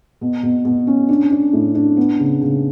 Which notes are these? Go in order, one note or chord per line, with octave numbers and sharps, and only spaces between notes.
B2
B2
B2
C#4
D4
D4
A2
D4
B3
C#3
C#3